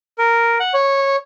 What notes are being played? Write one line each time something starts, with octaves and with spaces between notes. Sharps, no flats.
A#4
F#5
C#5